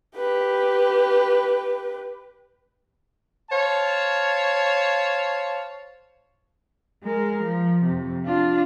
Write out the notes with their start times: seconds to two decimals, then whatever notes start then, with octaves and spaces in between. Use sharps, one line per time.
0.17 G4 B4
3.51 C5 C#5 F5 A5
7.03 G#3 A#4
7.43 F3
7.85 F2 C3
8.25 D4 F4